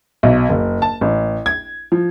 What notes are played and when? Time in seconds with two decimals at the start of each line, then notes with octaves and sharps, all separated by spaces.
0.23 B1
0.49 F#1
0.82 A5
1.01 A1
1.46 G#6
1.92 F3